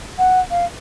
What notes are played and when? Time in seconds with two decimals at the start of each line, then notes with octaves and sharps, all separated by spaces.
0.18 F#5
0.50 F5